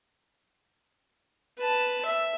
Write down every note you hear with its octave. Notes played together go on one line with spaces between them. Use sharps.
B4 A5
E5